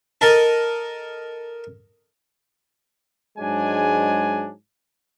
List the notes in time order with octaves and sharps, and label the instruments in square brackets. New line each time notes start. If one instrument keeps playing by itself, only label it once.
[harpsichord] A4 A#4 D#5 A5
[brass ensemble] G#2 F#3 G#3 D4 G#5